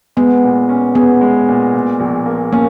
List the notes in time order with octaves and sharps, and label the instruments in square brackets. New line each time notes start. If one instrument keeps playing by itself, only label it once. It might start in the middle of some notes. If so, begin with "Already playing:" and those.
[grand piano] G#3 [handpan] B3
[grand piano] A#2
C#4
[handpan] B3 [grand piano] G#4
[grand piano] G#3
A#2
A#2
A#1
A#3
[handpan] A#3 [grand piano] C#4